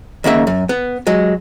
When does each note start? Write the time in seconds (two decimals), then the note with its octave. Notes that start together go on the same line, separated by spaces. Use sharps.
0.24 D#2 C#3 A#3 E5
0.47 F#2
0.69 B3
1.07 F#3 G#3